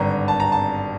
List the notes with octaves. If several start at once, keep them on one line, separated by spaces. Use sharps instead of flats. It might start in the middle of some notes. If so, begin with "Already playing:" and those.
Already playing: G#1 G2 D3 A#5
A5
A#5
A5